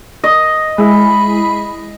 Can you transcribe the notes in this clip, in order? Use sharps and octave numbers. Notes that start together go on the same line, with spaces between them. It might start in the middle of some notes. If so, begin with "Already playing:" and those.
D#5
G#3 E4 B5